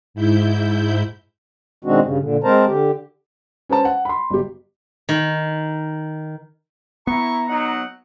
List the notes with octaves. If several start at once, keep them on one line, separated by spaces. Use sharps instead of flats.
G#2 E4 G6
B2 D#3 G#3 C4 D4 F#4
G2 C#3
A#2 D3
G#3 C4 A#4 C5 A5 A#5
D3 G4
C#4 B4 C5 A5
F#5
B5 C6
G1 G4
D#3
B3 E4 A#5 C#6
F#3 D#4 F#5